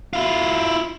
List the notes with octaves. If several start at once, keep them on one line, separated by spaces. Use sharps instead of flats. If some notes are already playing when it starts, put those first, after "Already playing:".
E4 F4